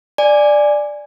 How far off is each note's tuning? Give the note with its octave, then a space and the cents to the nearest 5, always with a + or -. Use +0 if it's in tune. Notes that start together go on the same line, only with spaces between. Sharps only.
D5 +5 G#5 -5